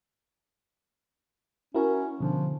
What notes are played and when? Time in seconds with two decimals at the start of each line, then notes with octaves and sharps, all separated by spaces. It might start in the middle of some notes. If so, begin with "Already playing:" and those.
1.75 C#4 E4 F#4 A#4
2.21 B2 D3 F3